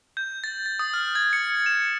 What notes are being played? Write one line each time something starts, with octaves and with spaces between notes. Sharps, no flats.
G6
A6
A6
D#6
F6
G#6
C#7
E7